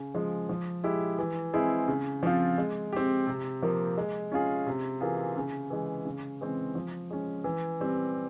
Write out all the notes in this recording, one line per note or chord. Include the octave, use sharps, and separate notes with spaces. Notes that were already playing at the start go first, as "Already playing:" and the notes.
Already playing: C#3
F3 G#3
F3
G#3 E4 G4
E3
G#3 C4 E4 G#4
C#3
F3 C4 F4
G#3
C4 G4
C3
F3 A#3
G#3
C#4 F4 G#4
C3
E3 A#3 F4 G#4
C#3
E3 G#3
C#3
E3 G#3 C4
F3
G#3 C#4
E3
G3 C4 G4